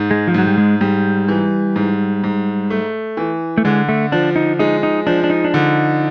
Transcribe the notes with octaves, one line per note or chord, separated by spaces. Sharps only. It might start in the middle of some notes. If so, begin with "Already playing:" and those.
Already playing: G#2
G#3
F3
G#2 F#3
G3
G#3
G#2 G3
E3
G#2
G#2
A3
E3
A3
D3 G#3
A3
F3 D4
D#4
G#3 D#4
D#4
F3 D4
D4
D#4
D4
D3 D#4